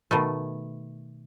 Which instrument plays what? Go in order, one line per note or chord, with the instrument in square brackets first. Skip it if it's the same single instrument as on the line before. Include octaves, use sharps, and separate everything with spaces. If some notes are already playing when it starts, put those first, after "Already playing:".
[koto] B2 D#3 A3